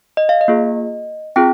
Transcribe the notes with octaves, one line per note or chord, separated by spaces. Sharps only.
D#5
F5
D#5
A#3 F4 G#4
C4 F4 G#4 G5